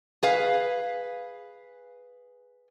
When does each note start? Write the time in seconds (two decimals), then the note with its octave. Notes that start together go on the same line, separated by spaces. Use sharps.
0.23 G#4 B4 F5